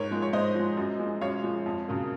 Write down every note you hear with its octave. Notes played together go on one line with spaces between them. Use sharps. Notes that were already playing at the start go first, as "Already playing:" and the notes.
Already playing: G#2 A#4 C#5
F3 G#3
C#5
G#2 C5 D#5
F3 G#3
F#2
F3 G#3
F#2 C#5 F5
F3 G#3
F2
C#3 F#3 A#3